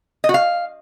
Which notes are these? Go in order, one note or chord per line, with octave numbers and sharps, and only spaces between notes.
D#5
F#4
F5